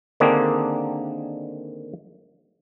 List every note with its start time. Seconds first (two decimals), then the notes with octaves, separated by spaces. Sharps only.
0.20 D3 D#3 A#3 C4 D4 G#4